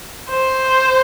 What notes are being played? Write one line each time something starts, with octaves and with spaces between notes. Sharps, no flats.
C5